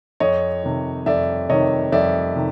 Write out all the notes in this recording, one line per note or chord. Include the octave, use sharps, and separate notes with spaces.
F2 C#5 D#5
C3 D#3
F2 D5 E5
C3 D#3 C#5 D#5
F2 D5 E5
C3 D#3